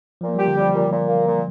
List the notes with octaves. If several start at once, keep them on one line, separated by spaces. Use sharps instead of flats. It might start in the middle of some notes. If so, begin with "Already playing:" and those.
A#2 F3
A#3
G3 G4
D3
G3
F3
A#2
A#2
A#3
A#2